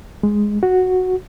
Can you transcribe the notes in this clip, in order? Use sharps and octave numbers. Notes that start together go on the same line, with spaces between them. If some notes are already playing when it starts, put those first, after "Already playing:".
G#3
F#4